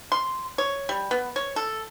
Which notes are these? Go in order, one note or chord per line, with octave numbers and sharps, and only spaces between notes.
C6
C#5
G3
B3
C#5
A4